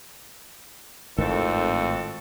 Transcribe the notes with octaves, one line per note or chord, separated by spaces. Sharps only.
G#1 F2 A2 D#3 C4 F#4 A4